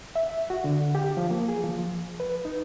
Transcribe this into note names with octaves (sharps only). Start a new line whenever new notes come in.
E5
F#4
D3
G4
F3
A#3
G#4
F3
B4
D#4